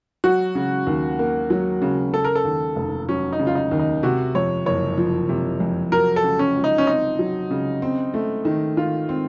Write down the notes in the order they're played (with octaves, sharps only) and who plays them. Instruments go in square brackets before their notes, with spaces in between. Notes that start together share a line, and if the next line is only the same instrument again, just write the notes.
[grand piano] F#3 [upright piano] F#4
[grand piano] C#3
D#2
A#3
F#3
C#3
[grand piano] C#3 [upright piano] A4
[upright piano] A#4
A4
[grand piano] D#2
F1
[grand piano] F#3 [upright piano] C#4
[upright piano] D#4
[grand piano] C#3
[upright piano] F4
D#4
[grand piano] D#2
[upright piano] D#4
[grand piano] C3 [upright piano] F#4
[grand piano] F2 [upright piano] C#5
[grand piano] F#1 [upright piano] C#5
[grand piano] F3
C3
F2
[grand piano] F#3 [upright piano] A#4
[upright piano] A4
[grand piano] C#3
[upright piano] C#4
[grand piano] C#2
[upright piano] D#4
C#4
[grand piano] C4 [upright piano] D#4
[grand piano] F#3
C#3
C4
A3
D#3
[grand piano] D#3 [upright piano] F4
[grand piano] C4